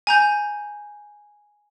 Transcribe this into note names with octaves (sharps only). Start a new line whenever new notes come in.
G#5 A#5 G6